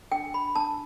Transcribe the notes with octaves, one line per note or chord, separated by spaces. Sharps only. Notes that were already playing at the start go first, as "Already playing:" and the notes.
D4 G5
B5
D4 A5